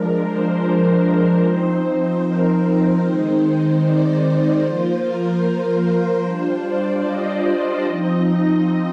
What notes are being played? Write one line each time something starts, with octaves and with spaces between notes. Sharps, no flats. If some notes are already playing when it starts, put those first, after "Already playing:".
Already playing: F3 G#3 D4 A#4
C5
F3 C4 D#4
A#4
A#4
D#3 G#3 C4 D#4 C5
C5
D5
F3 A#3 F4 C5
A#4
C5
A#4
G3 D4 F4 C5
D5
D#5
F3 C4 D#4